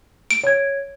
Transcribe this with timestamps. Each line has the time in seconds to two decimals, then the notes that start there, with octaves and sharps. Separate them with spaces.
0.31 D7
0.44 C#5 G#6